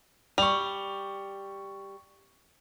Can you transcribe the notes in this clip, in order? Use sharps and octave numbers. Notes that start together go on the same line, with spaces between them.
G3 C#6 F7